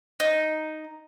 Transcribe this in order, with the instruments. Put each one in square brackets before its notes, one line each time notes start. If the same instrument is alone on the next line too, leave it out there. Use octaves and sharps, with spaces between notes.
[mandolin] D#4